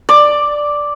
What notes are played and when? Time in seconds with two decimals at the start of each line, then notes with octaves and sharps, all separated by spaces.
0.09 D5